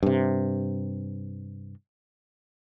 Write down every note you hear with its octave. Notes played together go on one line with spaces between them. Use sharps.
G2 C3